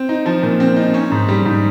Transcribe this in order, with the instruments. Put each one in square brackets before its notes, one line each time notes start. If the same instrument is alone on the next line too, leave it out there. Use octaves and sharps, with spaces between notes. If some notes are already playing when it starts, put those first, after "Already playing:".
Already playing: [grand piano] C4
D#4
F3
A#2
C4
D#4
C#4
G#2
G3
G#2